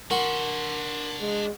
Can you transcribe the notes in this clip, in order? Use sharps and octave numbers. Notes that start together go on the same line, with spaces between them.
D4 F#4 A#4 C6
G#3